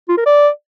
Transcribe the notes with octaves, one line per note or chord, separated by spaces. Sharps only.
F4
A#4
D5